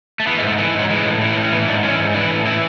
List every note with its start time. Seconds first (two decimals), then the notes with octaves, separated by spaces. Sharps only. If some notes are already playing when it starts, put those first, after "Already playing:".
0.20 A3
0.27 E3 B3
0.38 G#3
0.42 G#2 A3
0.58 E3 A3
0.74 G#2
0.79 F#3
0.89 E3 G#3
1.05 A2
1.21 E3
1.37 A2
1.43 C#4
1.52 E3 B3
1.68 G#2 D4
1.83 E3 C#4
1.99 G#2
2.14 E3 D4
2.31 A2
2.45 E3 E4